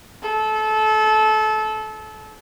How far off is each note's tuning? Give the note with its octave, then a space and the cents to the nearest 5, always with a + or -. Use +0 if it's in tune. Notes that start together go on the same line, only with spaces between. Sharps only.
A4 -25